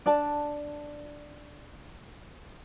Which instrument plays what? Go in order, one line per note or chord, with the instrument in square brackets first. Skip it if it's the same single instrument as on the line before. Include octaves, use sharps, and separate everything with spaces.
[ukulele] D4 D5 A5